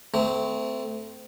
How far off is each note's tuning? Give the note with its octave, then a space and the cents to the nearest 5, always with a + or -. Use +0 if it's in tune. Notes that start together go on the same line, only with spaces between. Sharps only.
A3 +0 C4 -30